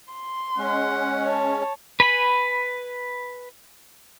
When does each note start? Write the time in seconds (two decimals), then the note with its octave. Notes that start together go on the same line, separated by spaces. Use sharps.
0.13 C6
0.58 G#3 C#4 F#5
1.24 C#5 A5
2.00 B4 G#5 B5